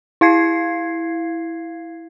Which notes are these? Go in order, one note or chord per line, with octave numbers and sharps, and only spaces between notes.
E4 F5 G#6 C7